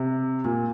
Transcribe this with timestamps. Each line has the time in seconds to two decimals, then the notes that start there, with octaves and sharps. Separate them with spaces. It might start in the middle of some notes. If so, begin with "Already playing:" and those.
Already playing: C3
0.44 A#2